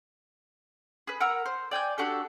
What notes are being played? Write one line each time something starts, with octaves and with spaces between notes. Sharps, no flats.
G#4 B4
A#4 F#5 A#5 E6
C5
D5 G5 G#5 G6
D4 F#4 G4 A4